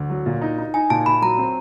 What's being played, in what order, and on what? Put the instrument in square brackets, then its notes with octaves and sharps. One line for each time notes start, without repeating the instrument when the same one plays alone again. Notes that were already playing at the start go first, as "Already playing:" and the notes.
Already playing: [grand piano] D2
F#3
A#2
D#4
D#4
[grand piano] D#4 [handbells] G#5
[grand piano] A#2 [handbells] A5
[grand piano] A#2 [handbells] B5
[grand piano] F#3 [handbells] A#5
[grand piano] C4